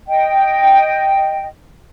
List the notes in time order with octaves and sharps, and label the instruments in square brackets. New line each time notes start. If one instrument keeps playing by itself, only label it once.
[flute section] D#5 G5